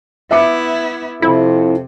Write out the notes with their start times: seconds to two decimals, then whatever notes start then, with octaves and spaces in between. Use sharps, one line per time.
0.31 B3 E4 E5 D6 C#7
1.22 F2 C3 E4